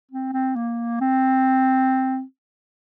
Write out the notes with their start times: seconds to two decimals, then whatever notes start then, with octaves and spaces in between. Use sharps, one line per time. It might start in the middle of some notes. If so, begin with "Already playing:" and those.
0.11 C4
0.33 C4
0.56 A#3
1.01 C4